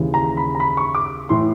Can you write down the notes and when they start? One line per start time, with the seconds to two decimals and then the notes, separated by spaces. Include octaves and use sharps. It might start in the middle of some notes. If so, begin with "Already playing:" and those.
Already playing: D#2 C#3 E3
0.14 A#5
0.37 B5
0.55 A#5
0.60 B5
0.77 C#6
0.95 D6
1.29 A2 E3 C6